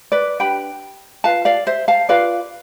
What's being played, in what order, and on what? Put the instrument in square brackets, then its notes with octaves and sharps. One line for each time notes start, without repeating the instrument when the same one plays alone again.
[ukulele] B4 D5
D4 G4 B4 G5 B5
F4 B4 F5 A5
D5 F5
C5 E5
F5 A5
F4 B4 D5 F5